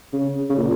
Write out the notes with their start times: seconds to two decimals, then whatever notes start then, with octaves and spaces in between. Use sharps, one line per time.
0.13 C#3
0.50 C#3
0.58 A#2